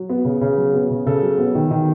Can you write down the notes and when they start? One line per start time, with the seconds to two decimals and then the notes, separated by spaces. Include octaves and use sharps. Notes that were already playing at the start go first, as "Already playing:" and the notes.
Already playing: F#3
0.10 B3
0.25 C#3
0.41 C#3
0.57 F#3
0.73 B3
0.90 C#3
1.06 C#3 A4
1.22 F#3
1.38 B3
1.55 D#3
1.71 D#3